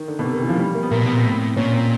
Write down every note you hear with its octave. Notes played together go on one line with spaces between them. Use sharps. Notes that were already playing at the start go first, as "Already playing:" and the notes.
Already playing: D#3
D3
B2
C3
D#3
E3
F3
G3
A#3
B3
A#2 A#3
B2
B3
A#2 C4
A2
A#2 C#4
C4